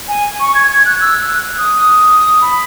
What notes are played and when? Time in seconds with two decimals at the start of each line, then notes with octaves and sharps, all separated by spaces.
0.08 G#5
0.40 C#6
0.55 G#6
0.71 G#6
0.86 F#6
1.01 E6
1.17 F#6
1.58 D#6
2.41 B5